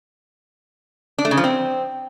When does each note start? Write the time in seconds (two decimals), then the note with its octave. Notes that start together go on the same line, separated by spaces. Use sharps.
1.18 D4
1.25 A3
1.31 C#3
1.37 F3
1.44 C4